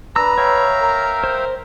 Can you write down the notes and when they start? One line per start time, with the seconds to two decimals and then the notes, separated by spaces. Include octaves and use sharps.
0.16 D4 B4 A#5 E6
0.38 C#5 E5 F5 G5
0.82 A#4
1.24 C5